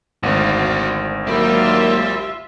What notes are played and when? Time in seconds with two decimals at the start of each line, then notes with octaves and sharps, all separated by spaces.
0.23 G#1 D2 F#4 F5
1.27 D#3 F#3 A#3 F4 G4 E5 B5